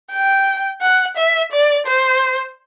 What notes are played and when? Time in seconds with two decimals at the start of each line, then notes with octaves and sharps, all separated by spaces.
0.11 G5
0.81 F#5
1.17 E5
1.52 D5
1.87 C5